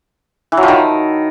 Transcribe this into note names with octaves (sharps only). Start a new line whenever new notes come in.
E3
F#3
F3
D#3